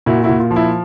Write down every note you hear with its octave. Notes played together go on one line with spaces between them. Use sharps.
A#2 E4 F#4
E4 F#4
A#2
F4
F3
E4